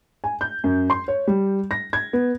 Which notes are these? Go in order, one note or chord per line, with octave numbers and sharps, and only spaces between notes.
G#5
G6
F#2
C6
C#5
G3
A#6
G#6
B3